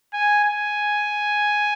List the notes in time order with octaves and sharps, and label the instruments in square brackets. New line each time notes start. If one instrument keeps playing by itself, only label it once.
[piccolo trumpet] G#5
G#5